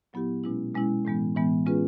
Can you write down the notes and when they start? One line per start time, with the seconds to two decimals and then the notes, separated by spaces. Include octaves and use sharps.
0.13 A#2 F#3 B3 E4 G4
0.44 B2 G#3 C#4 E4
0.75 B2 G#3 C#4 E4
1.05 A2 E3 G#3 B3
1.35 A2 E3 G#3 B3
1.66 G#3 C#4 F4 G#4 B4